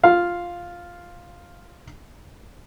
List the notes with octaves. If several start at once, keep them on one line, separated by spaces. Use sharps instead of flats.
F4 F5